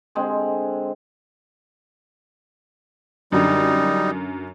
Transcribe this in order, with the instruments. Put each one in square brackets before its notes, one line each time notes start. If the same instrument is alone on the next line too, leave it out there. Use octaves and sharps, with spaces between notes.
[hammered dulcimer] D3 G#3 C4
[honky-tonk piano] F#2 D3 [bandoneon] G3 D#4